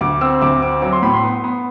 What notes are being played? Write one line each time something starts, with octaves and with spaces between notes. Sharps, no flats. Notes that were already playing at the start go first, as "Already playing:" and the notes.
D2 D6
C4 E6
D2 D6
C4 D6
F#3 D6
C6
A2 B5
C6
B3
B3